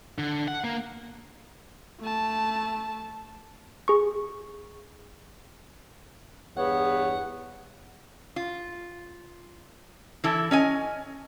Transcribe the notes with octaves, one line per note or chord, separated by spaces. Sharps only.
D3
F#5
A#3
A3 A5
G#4 C#6
E2 G2 B3 C#5 F#5
F4
E3 E4 A4
C#4 D#5 G#5